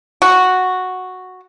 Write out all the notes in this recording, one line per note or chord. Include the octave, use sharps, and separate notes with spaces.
F#4